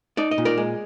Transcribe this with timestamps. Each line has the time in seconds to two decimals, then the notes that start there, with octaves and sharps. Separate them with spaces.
0.17 D#4 D5
0.31 D#5
0.38 A#2
0.45 A#4 D5
0.58 G#3